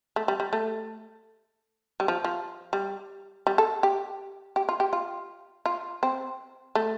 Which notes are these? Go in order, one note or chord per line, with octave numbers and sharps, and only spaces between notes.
A3
G3
G3
A3
G3
F3
F3
G3
G3
A4
G4
G4
F4
G4
F4
F4
C4
A3